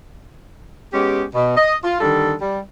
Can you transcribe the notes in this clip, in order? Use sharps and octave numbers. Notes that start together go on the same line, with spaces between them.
G#3 B3 C#4 G4
B2
D#5
F4
D3 D#3 G3 A4
G3